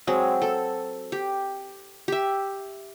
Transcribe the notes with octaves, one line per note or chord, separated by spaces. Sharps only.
F#3 G#3 C4
A4
G4
G4 E5